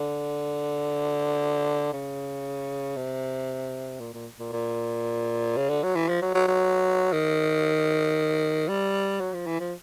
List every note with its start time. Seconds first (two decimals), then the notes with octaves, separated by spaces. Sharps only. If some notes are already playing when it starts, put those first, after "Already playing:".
Already playing: D3
1.93 C#3
2.96 C3
4.00 A#2
4.14 A#2
4.39 A#2
4.52 A#2
5.57 C#3
5.69 D3
5.83 F#3
5.95 E3
6.09 F3
6.22 F#3
6.34 F#3
6.48 F#3
7.12 D#3
8.68 G3
9.20 F#3
9.33 F3
9.46 E3
9.60 F3